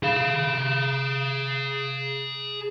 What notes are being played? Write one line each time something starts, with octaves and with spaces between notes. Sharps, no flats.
G#4 F5